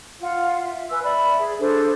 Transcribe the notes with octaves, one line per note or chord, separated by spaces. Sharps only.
F4 F5 F#5
E5
B4 G#5 E6
D5 E5 B5
G#4
D4 G#4 A4 C5